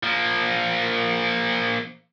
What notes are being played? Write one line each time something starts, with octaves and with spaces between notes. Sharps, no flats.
F3 A#3